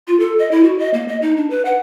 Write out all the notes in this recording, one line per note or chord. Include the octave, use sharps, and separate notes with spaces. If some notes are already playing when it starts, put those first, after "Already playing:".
F4
A4
D#5
E4
F#4
D#5
A#3
D#5
D#4
D4
B4
F#5